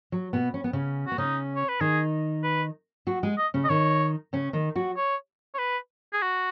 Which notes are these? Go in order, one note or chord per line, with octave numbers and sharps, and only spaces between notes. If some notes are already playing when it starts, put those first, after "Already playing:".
F#3
B2 B3
C#4
B3
C#3 C#4
B3 F#4
C#3 C#4 D#4
C#5
B4
D#3 D#4 G#4
B4
F#3 F#4
G#3 G#4
D#5
C#3 C#4
D#5
D#3 D#4 C#5
C#3 C#4
D#3 D#4
F#3 F#4
C#5
C#5
B4
G#4
F#4